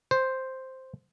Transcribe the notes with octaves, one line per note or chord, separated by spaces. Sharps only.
C5